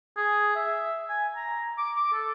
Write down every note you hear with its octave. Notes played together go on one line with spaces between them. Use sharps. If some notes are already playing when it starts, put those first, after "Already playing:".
G#4
E5
G#5
A#5
D6
D6
A4